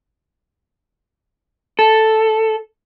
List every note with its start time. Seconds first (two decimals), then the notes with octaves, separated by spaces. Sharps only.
1.79 A4